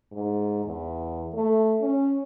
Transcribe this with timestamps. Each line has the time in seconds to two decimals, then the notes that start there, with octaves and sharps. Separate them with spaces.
0.12 G#2
0.65 E2
1.34 A3
1.81 C#4